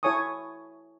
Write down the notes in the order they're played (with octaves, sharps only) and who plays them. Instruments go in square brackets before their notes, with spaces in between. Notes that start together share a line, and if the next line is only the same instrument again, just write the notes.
[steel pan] E4 A4 C#5 G#5 C#6 D#6